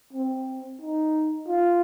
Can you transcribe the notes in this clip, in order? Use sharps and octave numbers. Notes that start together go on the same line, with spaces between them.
C4
D#4
F4